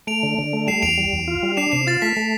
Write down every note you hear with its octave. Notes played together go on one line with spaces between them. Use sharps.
A3 D7 F7
D3
D3
A3
G3 C7 E7
E2 D7 F7
G3
E2
F4
G3
D4 C7 E7
C3 C7 E7
F4 A6
A3 B6
A3